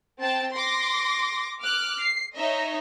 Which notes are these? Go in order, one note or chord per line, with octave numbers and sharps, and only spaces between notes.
C4 G5 A5 A6
C6 D6 A#6
D6 F6 F#6
C7
D#4 C#5 D#5 E5